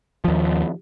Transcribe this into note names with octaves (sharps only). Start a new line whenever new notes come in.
D#2 F3